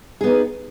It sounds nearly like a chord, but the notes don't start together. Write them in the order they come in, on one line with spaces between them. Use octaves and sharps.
G#4 B3 D#4